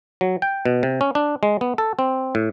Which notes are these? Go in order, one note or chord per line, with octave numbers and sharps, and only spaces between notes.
F#3
G5
B2
C3
C#4
D4
G#3
B3
A4
C4
A2